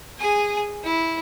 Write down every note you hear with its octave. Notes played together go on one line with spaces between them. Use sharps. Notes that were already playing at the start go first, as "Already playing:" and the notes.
G#4 G#5
E4